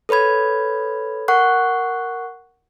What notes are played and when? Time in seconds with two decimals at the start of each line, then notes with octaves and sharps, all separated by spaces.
0.09 A4 B4 C#5 B5 G#6
1.28 A#4 F#5 C#6 F#6